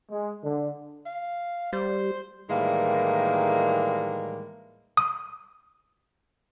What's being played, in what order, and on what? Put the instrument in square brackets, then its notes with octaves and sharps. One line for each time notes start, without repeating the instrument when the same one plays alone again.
[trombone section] G#3
D3
[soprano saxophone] F5
[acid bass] G3 [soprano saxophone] C5
[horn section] A2 D#3 E3 G3 G#3 A#3
[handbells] D#6